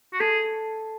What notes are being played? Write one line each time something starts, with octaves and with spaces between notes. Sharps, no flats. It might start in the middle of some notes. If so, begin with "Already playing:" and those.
F#4
G#4 A4